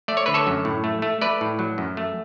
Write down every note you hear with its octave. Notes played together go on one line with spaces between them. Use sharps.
A3 D5
C#5
D3 B4
A4 C#5
F#2
A2
A3
A3
A3 B4 D5
A2
F#3
F#2
A3